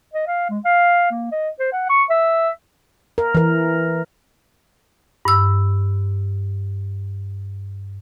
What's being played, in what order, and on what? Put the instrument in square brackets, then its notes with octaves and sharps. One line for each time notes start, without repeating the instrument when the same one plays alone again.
[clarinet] D#5
F5
G#3
F5
A#3
D#5
C5
F#5
C#6
E5
[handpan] A#4
E3 A#4
[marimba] G2 E6